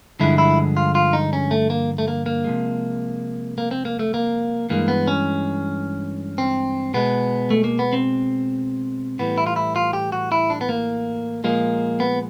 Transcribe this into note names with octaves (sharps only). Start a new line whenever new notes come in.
G2 D3 F3 G#3 E4
E4
F4
F4
D#4
C#4
A3
A#3
A3
A#3
A#3
C3 F3 G#3
A#3
C4
A#3
A3
A#3
G2 E3 G#3 A#3
B3
C#4
C4
B2 G#3 B3
A3
A#3
B3
C4
A2 E3 G3 B3
E4
F4
E4
F4
G4
F#4
E4
D4
B3
A#3
A#2 F3 G#3 A#3
B3